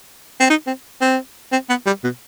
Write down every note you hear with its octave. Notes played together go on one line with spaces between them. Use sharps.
C4
D#4
C4
C4
C4
B3
G3
B2